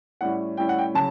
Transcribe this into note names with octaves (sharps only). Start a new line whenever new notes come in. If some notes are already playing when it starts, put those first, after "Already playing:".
A2 G3 C#4 E4 F#5
A2 G3 C#4 E4 G5
F#5
G5
C#3 F#3 A5